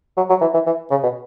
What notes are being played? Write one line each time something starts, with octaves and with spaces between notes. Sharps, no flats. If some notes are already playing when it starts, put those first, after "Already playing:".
F#3
F#3
E3
E3
E3
C#3
B2